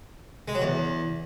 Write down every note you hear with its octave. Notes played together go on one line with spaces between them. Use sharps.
G#3
F#3
E2